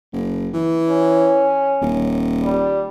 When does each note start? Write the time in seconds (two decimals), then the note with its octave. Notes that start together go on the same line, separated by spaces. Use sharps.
0.13 F#1
0.53 E3
0.90 C#4
1.81 D#1
2.44 G3